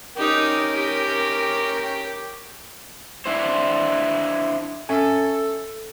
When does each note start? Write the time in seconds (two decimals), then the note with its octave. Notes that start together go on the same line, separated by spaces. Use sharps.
0.17 C#4 D#4 G4 A#4 G5
0.74 G4
3.26 D4 E4 C5
4.89 C#4 A4 E5 G#5